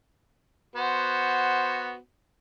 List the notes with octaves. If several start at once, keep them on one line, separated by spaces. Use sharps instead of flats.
B3 F#4 C5